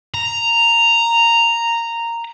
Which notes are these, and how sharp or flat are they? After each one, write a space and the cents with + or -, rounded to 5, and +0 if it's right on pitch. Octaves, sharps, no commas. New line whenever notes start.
A#5 -5